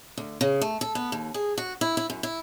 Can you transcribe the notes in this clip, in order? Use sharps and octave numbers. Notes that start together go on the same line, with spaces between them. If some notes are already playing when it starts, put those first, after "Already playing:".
D2
C#3
A3
A4
B3
D#2
G#4
F#4
E4
E4
F#2
E4